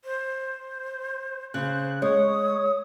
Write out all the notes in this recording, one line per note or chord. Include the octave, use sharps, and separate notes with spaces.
C5
C#3 C5 F#6
G#3 C#5 D#6